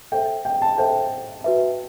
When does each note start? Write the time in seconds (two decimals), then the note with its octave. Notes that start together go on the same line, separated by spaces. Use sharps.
0.12 A4 C5 E5 G5
0.45 G5
0.62 A5
0.78 A4 C5 E5 G5
1.44 F#4 B4 E5